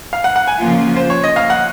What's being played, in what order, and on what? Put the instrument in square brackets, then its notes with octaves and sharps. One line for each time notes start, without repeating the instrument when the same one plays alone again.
[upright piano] F5
F#5
F#5
G#5
[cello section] C#3 F3 A#3 F4
[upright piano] C5
C#5
D#5
F5
F#5